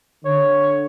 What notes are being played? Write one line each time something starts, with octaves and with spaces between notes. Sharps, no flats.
D3 C#5